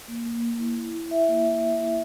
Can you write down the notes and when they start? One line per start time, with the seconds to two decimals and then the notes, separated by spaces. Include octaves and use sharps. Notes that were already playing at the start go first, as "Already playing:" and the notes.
0.08 A#3
0.25 A#3
0.42 A#3
0.59 E4
0.77 E4
0.94 E4
1.11 E4 E5
1.29 A#3
1.46 E4
1.64 A#3
1.80 E4